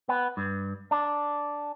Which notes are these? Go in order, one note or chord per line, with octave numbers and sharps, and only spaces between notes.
B3
G2
D4